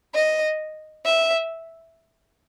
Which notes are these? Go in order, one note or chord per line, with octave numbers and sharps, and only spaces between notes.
D#5
E5